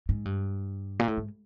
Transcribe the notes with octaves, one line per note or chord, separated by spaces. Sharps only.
G#2
G2
A#2
A2
G#2